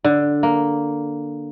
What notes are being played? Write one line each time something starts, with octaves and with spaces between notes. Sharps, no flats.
D3
A#3